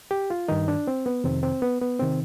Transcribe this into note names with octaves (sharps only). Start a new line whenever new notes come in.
G4
F4
G2 D#3 D#4
D4
C4
B3
F2 C3 D#3 C4
C4
B3
B3
C3 D#3 C4